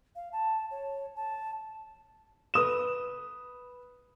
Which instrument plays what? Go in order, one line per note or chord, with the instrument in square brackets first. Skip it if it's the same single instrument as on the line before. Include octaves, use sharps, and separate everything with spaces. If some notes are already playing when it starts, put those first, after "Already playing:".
[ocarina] F5
A5
C#5
A5
[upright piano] B4 D#6 E7